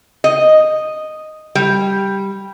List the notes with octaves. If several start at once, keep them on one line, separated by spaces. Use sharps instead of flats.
D#5
G3